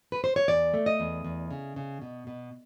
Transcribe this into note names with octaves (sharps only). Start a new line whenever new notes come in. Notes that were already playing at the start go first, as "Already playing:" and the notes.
B4
C5
C#5
E2 D5
A3
D#5
E2
E2
C#3
C#3
B2
B2